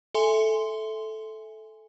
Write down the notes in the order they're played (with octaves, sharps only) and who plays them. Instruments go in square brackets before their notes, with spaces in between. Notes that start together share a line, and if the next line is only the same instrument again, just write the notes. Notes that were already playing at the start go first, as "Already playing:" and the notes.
[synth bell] A4 E5 G#5 C6